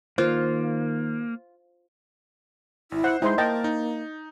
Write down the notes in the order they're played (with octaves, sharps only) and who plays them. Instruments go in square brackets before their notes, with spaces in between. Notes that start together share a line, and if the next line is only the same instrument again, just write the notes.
[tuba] D#3 [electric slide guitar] A#3 [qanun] F4 [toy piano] C5
[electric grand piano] G#1 [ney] E4
[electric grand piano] C5 [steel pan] F#5
[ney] G#3 [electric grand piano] D#4 [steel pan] E4 C5 C6
[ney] A#3 [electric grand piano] A#4 A5 A6 [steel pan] D#5 G5
[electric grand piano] D#4